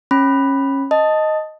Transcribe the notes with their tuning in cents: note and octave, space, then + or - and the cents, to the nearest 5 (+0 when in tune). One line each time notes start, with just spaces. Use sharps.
C#4 -20 B5 +0
D#5 +0 A5 +0